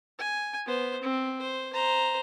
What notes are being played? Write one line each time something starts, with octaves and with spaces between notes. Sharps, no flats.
G#5
B3 C5
C4
C5
C5 A#5